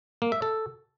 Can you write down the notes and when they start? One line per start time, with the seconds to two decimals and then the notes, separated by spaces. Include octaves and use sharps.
0.22 A#3
0.32 E5
0.42 A4